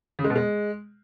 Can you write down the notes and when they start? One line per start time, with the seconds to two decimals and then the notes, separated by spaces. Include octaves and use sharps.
0.19 C#3
0.24 G#3
0.30 B2
0.36 G#3